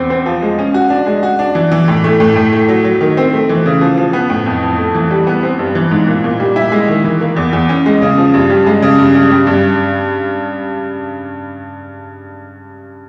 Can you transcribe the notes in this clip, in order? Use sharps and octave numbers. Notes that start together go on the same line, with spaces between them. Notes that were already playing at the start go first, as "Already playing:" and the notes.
Already playing: E2 C4
C4
F3
G#3
C#4
F#4
D4
G#3
F#4
D4
E3
E3
A2
A3
A2
A2
A3
F#3
F#3
D#3
C4
A3
E3
C#3
F3
F3
B3
A2
F2
F2
A3
E3
G3
B3
C4
G2
E3
G#2
A#2
A#2
G3
E4
G#3
D#3
E3
A#3
E2
E2
C#4
G#3
C#3
F3
G2
G3
G#3
C#3
G2
G2
G3
G2